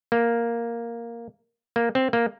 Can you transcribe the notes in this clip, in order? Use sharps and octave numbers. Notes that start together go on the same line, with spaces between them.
A#3
A#3
C4
A#3